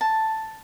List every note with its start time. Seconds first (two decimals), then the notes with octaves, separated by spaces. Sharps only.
0.01 A5